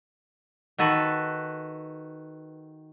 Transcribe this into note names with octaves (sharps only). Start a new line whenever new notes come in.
D#3 F#4 A4 B4